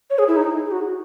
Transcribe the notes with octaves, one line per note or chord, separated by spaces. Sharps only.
C#5
G#4
E4
D#4
G#4
F#4